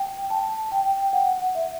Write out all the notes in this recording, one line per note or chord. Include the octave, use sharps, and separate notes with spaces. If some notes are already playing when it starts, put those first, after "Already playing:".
Already playing: G5
A5
G5
F#5
E5